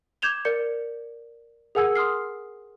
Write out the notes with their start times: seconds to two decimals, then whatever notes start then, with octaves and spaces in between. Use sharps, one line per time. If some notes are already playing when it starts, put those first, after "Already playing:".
0.22 D6 G6 G#6 E7 F7 G7
0.45 A#4 D5 G6 C#7
1.75 G#4 A#4 F#5 G#5 E6 G#6
1.96 C6 D#6 F6 C7